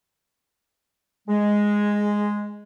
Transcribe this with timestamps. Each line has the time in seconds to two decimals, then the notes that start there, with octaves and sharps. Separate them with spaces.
1.28 G#3